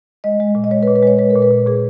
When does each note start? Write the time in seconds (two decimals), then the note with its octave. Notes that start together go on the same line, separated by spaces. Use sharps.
0.24 G#3 D#5
0.40 G#3
0.55 A#2
0.64 D#5
0.71 G#3 C#5
0.83 B4
0.88 A#2
0.96 B4
1.02 G#3 C#5
1.19 G#3 B4
1.30 A#4
1.35 A#2
1.42 B4
1.51 A#2
1.67 A#2 G#4